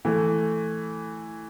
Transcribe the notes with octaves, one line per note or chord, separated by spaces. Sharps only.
E3 A3